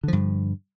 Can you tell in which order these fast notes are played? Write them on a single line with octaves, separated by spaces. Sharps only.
D3 F3 G2